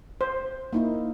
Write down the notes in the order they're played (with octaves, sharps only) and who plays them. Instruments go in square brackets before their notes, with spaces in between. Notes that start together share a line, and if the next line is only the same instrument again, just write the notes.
[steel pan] C5
[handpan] A#3 D#4 E4